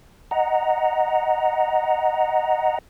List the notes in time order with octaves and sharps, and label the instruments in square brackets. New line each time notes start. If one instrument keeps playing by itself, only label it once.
[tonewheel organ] D#5 F#5 A#5